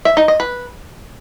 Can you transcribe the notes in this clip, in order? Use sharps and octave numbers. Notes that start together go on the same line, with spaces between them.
E5
D#4
D#5
B4